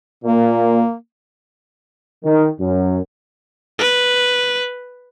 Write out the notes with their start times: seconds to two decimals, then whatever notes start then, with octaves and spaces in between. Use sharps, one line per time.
0.24 A#2 A#3
2.25 D#3
2.60 F#2
3.79 B4